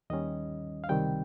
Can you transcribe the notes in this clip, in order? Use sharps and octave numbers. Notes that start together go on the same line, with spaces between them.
D#2 D#3 G3 C#4 D#5
F5
C#2 C3 D#3 G3 C4 G5